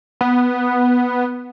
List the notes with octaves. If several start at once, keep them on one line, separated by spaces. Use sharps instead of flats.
B3